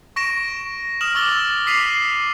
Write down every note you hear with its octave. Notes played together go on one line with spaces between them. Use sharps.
C#6 A#6 D7 E7
D#6 F6 E7 F#7
C#6 D6 E6 A6 F#7 G7
D6 D#6 B6 C7 D#7 F7